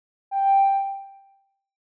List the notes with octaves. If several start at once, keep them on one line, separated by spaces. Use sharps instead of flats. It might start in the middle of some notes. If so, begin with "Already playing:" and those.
G5